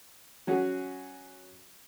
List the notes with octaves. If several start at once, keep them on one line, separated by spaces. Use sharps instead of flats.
F#3 C#4 F#4 G#4